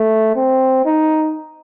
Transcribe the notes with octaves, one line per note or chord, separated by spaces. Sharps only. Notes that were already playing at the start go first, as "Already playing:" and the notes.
Already playing: A3
C4
D#4